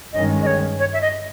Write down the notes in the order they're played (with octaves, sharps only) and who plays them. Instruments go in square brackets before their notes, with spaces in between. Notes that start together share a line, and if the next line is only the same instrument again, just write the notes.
[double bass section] G1 G2 D#3 G#3 C#4 [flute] D#5
[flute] D#5
C#5
C#5
E5
D#5